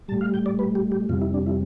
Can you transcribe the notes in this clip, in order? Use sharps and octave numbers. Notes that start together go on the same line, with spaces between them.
A2 G3 A5
F5
G5
D5
B4
G4
G4
F2 C3 G3 F4
E4
D4
E4